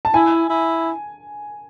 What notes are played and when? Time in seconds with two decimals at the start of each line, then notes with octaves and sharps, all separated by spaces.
0.05 A5
0.14 E4 G#5
0.49 E4